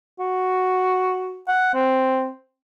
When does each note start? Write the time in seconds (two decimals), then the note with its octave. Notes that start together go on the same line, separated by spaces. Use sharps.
0.20 F#4
1.48 F#5
1.74 C4